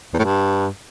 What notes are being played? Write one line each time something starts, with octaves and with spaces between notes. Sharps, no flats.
E2
A2
G2